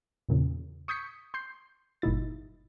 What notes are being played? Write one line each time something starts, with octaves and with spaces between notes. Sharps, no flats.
E2 A#2 C#3
C#6 D#6 G6 G#6 B6 C#7
C6 G6 C7
G1 A#2 D#4 E4 A6